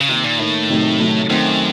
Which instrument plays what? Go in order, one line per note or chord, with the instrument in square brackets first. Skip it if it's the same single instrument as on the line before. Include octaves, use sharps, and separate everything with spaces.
[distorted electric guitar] C#3
[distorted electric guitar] C3 [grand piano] D#3 A#3 D#4
[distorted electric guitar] A#2
[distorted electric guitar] A2 [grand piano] D#3 A#3 D#4
[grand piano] C3 D#3 F#3 A3 D#4
C3 D#3 F#3 A3 D#4
[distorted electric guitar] F#2 [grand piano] D#3 A3 C4